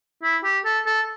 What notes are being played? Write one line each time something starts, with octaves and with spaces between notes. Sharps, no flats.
E4
G4
A4
A4